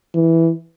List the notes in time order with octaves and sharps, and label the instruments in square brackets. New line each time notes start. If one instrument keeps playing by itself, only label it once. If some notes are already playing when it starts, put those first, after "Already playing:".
[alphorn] E3